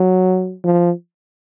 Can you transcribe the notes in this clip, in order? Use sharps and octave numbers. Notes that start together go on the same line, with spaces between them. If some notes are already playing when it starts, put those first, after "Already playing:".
Already playing: F#3
F3